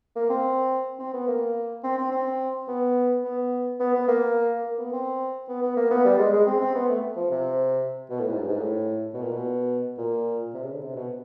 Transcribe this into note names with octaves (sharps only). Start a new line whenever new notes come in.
A#3
C4
C4
B3
A#3
C4
C4
C4
B3
B3
B3
B3
A#3
A#3
B3
C4
B3
B3
A#3
B3
G3
G#3
G#3
C4
C4
B3
A3
F3
C3
B2
A2
G#2
G2
G#2
A2
B2
A#2
B2
A#2
C3
C#3
D3
C3
B2